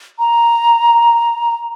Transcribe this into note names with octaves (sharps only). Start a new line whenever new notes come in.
A#5